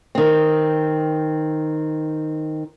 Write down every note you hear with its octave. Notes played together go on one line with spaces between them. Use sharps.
D#3 C4